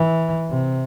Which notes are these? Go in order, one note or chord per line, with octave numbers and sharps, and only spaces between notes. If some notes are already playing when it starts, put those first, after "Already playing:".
Already playing: E3
C3